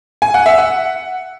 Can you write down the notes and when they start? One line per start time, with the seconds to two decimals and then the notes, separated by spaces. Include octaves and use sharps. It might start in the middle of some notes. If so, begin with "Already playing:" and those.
0.22 G#5
0.34 F#5
0.46 E5
0.58 F#5